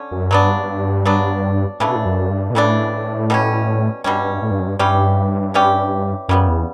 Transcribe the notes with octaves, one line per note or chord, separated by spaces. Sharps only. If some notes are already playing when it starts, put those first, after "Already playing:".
Already playing: D3 C#4
F#2
G2 F#3 B3 D4
F#3 B3 D4
A2 C#3 E3 A3 D4
B2
A2
F#2
G2
B2
A2 C#3 E3 A3 D4
B2 G3 C#4
G2 B2 G3 C#4
A2
G2
F#2
G2
G2 E3 G3 C#4 G4
E3 G3 C#4 G4
F#2 C#3 G3 B3
E2